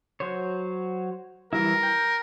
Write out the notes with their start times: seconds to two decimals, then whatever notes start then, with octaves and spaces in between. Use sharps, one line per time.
0.20 F#3 C5 C#5
1.53 E3 G3 E4 A#4
1.83 G5